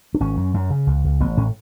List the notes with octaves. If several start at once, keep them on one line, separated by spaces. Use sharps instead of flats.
D4
G#1 C#4
F#2
F#2
C#3
C#2
C#2
A1 B3
A2 C#4